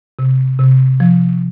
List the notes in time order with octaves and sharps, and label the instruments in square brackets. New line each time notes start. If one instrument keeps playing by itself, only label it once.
[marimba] C3
C3
F3